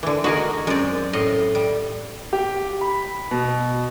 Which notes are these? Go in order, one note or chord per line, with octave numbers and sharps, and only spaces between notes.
D3 E3
D#4 F#4 G#4 A#4
F#2 G#3 C4 D5
A2 D#5
G3
G4
B5
B2